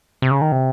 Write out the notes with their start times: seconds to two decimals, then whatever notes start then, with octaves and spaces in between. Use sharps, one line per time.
0.22 C3
0.31 C#3
0.41 D#3
0.52 C3